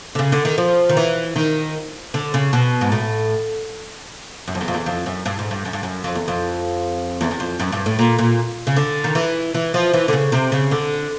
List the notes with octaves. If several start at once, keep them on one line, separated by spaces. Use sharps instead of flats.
D3
C#3
D3
D#3
F3
D#3
E3
D#3
D3
C#3
B2
G#2
A2
F#2
F2
E2
F2
E2
F2
F#2
G2
G#2
G2
F#2
G2
F#2
F2
E2
F2
E2
E2
F2
F#2
G2
A2
A#2
A#2
C#3
D3
D#3
E3
E3
F3
E3
D3
C#3
C3
C#3
D3